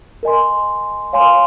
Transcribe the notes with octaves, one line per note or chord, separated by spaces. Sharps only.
A#4 D#5 G#5 C6
C#5 F5 G#5 C6